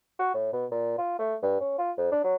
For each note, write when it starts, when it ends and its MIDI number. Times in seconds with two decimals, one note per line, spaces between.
0.19 0.30 66
0.34 0.53 45
0.53 0.66 47
0.71 0.98 46
0.98 1.15 65
1.19 1.35 57
1.42 1.59 43
1.60 1.76 61
1.78 1.91 65
1.97 2.08 41
2.11 2.20 62
2.24 2.35 54